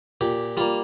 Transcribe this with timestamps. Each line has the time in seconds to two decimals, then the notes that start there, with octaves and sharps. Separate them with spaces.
0.21 A#2 G4
0.57 G3 A#3 F4